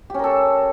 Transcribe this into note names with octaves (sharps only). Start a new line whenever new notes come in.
C#4 G4 A4 A#4